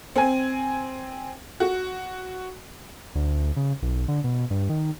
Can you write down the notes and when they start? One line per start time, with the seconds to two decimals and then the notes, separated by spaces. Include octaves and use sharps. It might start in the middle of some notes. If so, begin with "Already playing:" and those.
0.16 C4 G#5
1.60 F#4
3.15 D2
3.57 C#3
3.82 B1
4.08 D3
4.24 B2
4.50 G2
4.69 D#3